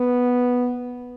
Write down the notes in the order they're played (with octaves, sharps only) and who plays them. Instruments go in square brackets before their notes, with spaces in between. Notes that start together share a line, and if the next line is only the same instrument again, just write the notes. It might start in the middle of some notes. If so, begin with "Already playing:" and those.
Already playing: [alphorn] B3